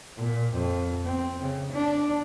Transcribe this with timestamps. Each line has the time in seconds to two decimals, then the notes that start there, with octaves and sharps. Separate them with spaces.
0.16 A#2
0.52 F2
1.05 C4
1.42 C#3
1.72 D4